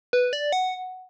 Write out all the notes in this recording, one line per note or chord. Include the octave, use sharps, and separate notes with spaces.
B4
D5
F#5